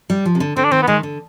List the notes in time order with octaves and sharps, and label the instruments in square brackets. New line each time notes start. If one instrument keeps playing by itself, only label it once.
[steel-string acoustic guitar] G3
F3
C3
D3
[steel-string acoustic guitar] D3 [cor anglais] C4
[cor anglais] D4
[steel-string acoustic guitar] D#3 [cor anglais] C4
[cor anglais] B3
[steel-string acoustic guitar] D#3 [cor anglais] G#3
[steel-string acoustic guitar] D3